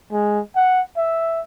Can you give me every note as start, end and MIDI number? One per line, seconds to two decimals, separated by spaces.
0.12 0.40 56
0.56 0.82 78
0.97 1.42 76